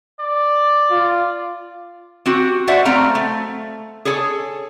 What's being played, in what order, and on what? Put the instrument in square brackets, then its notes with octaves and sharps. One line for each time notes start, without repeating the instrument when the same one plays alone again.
[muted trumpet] D5
[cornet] F4
[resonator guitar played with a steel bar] C4 F#4 G4
F#4 C5 D5 E5 F#5
F#3 A3 C4 F5 A#5
A3
G#4 A4 C#5 G#5